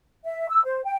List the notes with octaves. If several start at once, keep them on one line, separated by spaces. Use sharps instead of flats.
E5
E6
C5
G5